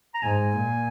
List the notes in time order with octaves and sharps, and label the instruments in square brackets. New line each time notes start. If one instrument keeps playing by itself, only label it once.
[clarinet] A#5
[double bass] G#2 [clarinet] G#5
[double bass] A#2